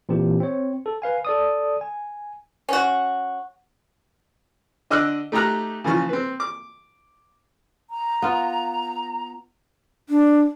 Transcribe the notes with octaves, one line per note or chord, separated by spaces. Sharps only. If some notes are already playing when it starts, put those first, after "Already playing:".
A#2 E3 C4 G4
C4 C#5
A4
B4 F5 G#5
A4 D5 D#6
G#5
C#4 F#4
D3 D#5 D6 E6 F#6
A3 D#4 G4 A#5 F#6
C#3 E3 F3 G#5 C#6
C4 B4
D6
A#5
B3 F4
D4